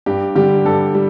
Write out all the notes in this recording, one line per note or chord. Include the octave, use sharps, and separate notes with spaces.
G2 G4
D3 G3 G4
G2 A4
G3